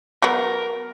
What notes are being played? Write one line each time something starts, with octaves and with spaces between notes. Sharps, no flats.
F#3 B3 A#4